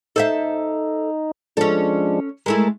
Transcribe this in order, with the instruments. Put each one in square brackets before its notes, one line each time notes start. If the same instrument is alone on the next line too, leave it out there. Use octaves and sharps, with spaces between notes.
[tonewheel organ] D#4 [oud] A4 C5 E5
[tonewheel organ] F3 G#3 D4 [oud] C#4 A4
[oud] G#3 A3 E4 [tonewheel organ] A#4